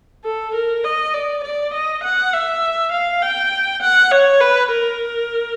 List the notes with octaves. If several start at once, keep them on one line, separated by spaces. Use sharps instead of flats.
A4
A#4
D#5
D5
D5
D#5
F#5
E5
F5
G5
F#5
C#5
B4
A#4